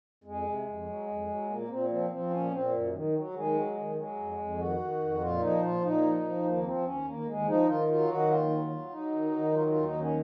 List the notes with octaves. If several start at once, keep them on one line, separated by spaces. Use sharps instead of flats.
F2 G#3
C3
F2
F#3
F2
F#3
A#2 A#3
A#2 C4
F3 C4
F3 C4
A#2 C#4
A#2 C4
F#2
D#3
F#3
D#3 G#3
F#3
D#3
F#3 G#3
F2
F2
D#3 F#4
D#3
F2
A#2 F4
F3 D#4
A#2 F4
A#2 D#4
F3
F3
D#2 A#3
F3 C4
D#2 C#4
D#2 A#3
D#2 G#3
F3 D#4
D#3 F4
F#3 F4
D#3 F#4
D#2 F4
F#3
F#3
F#3 D#4
D#3
D#3
F#3 F4
F4
D#2
D#4
D#3
C#4